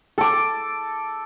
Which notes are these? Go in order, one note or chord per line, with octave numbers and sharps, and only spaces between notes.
A4 D6